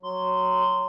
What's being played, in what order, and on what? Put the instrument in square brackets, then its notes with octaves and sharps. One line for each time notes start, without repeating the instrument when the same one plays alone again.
[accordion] F#3 [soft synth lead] C6